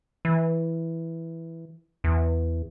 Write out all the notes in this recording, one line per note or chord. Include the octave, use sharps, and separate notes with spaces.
E3
E2